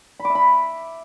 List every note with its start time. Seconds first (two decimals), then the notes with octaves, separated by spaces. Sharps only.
0.20 B5
0.25 D6
0.30 E5
0.35 B5